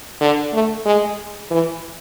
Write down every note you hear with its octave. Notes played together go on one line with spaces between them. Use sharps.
D3
A3
G#3
E3